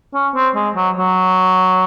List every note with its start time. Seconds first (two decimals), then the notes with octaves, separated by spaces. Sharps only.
0.14 C#4
0.35 C4
0.55 G#3
0.76 F#3
0.97 F#3